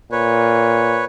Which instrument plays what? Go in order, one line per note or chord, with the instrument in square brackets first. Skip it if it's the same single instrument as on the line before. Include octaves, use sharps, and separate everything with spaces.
[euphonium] A#2 [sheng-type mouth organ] B4 C#5